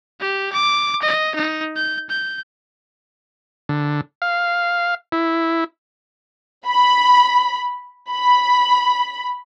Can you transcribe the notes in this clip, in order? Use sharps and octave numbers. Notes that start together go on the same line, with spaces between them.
G4
D6
D#5
D#4
G6
G6
D3
F5
E4
B5
B5